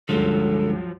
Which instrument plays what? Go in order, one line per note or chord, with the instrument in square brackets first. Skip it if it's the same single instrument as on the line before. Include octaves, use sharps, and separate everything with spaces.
[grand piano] C#2 G2 [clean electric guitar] D3 G#3 [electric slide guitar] F3 F#3 [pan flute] A4